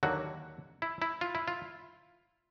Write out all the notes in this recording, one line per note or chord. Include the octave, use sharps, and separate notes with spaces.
D#2 D3 F#3 A#3 F#4
E4
E4
F4
E4
F4